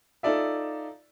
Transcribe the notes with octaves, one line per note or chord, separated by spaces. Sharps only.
D#4 F4 A4 D5 E5